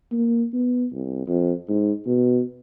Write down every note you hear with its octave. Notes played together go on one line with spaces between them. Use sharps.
A#3
B3
C2
F2
G#2
B2